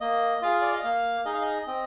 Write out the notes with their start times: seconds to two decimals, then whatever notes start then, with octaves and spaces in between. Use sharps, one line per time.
0.01 A#3 D#5
0.42 F4 G#4 F5
0.62 D5
0.73 D#5
0.84 A#3 F5
1.25 D#4 G#4 D#5
1.34 F5
1.42 D#5
1.67 C4 D#5